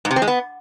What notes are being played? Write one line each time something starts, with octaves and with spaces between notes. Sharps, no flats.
G#2
C3
C4
G#3
B3